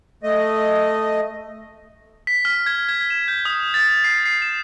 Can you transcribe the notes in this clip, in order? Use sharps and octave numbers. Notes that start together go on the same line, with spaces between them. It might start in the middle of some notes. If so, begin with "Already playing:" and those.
A3 D#5
B6
F6
G#6
G#6
E7
G6
D#6
A6
C7
C7
E7